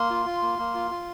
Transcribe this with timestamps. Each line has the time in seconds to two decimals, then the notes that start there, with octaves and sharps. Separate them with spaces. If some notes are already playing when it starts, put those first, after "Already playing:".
Already playing: A#3 C6
0.10 F4
0.26 F4
0.42 A#3
0.59 A#3
0.74 F4
0.91 F4